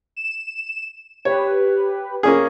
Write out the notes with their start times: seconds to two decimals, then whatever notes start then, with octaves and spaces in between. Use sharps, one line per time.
0.16 E7
1.25 G4 B4 C#5
2.23 A#3 C#4 G#4